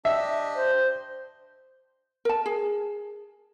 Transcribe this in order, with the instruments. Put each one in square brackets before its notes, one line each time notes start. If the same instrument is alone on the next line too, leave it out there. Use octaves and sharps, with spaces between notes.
[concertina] D4 G4 D#5 [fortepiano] E5
[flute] C5
[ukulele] A#4 A5
G#4